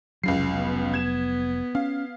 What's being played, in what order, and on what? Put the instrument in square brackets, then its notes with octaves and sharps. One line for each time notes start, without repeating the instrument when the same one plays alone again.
[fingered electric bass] F1 F#3 [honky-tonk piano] C#2 C#3 C7
[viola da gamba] B3
[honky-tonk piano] G#6 E7
[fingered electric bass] C#4 [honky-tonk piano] F5